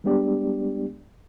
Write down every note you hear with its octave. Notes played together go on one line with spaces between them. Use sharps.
G3 G#3 B3 D4 G4 D5